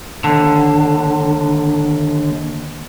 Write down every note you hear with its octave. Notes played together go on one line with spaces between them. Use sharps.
D#2 D3